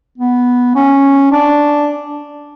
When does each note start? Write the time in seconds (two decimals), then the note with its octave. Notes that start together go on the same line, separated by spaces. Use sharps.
0.18 B3
0.75 C#4
1.31 D4